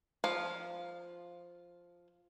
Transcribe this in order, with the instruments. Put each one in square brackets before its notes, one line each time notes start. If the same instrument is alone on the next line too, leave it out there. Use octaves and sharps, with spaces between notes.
[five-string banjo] F3 F5